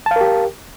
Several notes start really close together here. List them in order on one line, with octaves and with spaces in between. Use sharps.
A5 F5 A#4 G4